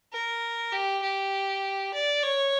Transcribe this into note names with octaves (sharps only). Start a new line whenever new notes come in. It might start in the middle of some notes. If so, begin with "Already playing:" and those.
A#4
G4
G4
D5
C#5